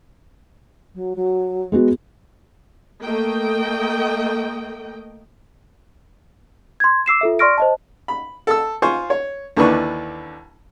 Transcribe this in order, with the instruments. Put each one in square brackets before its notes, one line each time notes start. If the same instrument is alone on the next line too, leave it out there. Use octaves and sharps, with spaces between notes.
[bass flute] F#3
F#3
[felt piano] G#3 B3 F#4
[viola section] A3 A#3 D#5 G5
[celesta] C6 G#6
D6 E6 C7 E7
F4 A4 E5
D5 C6 C#6 F6 A#6 D7
C5 D#5 A5
[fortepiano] B5
A4 E6
F4 C5 G#5 C#6
C#5
D#2 D3 E3 D4 B4 C#6